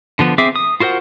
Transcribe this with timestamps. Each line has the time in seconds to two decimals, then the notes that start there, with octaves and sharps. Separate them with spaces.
0.19 D3 F3 B3
0.38 C4 G#4 E5 D6
0.56 D#6
0.80 F4 F#4 A#4 C5 F#5